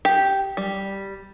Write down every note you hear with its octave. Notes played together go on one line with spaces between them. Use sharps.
G4
G3